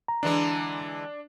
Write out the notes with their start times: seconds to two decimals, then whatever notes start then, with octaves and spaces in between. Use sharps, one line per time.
0.08 A#5
0.23 D3 E3 G#3 D4